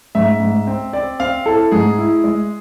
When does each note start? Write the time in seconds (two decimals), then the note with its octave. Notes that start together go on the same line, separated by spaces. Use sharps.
0.15 G#2 E5
0.40 G#2
0.67 C4
0.93 C4 D5
1.20 C4 F5
1.45 E4 A4
1.71 G#2 G#4
1.98 E4
2.24 G#3